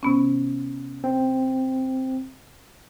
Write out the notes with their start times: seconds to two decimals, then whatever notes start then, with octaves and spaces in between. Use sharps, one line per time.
0.03 C3 B3 C#4
1.04 C4